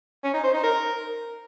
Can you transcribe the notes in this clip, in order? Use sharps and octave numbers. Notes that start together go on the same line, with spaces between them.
C#4
D#4
C5
D#4
A#4